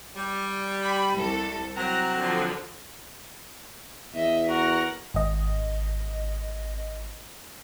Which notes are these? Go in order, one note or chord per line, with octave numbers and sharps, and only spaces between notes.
G3
B5
C2 A4
F#3 C4 A#5 F#6
D3 F3
E2 D#5 E5
F#4 A#4 F#5
G#1 D#5